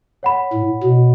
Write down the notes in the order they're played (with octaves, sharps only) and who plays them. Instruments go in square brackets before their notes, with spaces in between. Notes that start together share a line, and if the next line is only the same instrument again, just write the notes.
[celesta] C#5 F#5 B5
[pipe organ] A2
B2